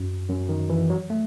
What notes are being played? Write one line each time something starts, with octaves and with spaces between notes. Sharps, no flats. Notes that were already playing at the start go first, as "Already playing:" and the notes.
Already playing: F#2
F#2
D#3
E3
F#3
A3